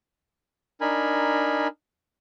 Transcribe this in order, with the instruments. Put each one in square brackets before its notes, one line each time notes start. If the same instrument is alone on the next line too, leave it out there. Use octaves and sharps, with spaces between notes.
[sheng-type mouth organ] D4 D#4 A#4 G#5 B5